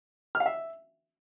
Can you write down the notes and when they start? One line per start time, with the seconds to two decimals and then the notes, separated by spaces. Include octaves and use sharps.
0.35 F6
0.40 F5
0.46 E5